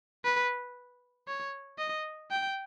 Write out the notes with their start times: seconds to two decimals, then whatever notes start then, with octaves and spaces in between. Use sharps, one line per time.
0.24 B4
1.28 C#5
1.78 D#5
2.31 G5